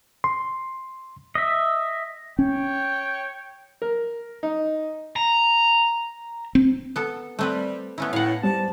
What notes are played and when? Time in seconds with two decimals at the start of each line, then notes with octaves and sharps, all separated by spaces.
0.24 C6
1.35 D#5 E5
2.39 C#4 C#5 G5
3.82 A#4
4.43 D#4
5.16 A#5
6.55 C4
6.96 B3 A4
7.39 G3 A3 C4 B4
7.98 A3 B3 C#4 E4
8.13 A2 F5 F#5
8.43 G3 C5 A5